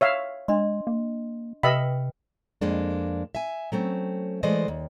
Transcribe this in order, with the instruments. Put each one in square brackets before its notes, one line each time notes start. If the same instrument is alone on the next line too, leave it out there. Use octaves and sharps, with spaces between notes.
[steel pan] C#5 E5 F5
[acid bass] G#3 [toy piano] D4 D#5 C6
[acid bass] A#3
[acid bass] C3 [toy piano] B4 G5 [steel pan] D#5 E5 B5
[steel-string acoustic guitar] F2 G#3 A#3 D4
E5 G#5
F#3 A3 C4 C#4
E3 G#3 A3 C5 D5 D#5
D#2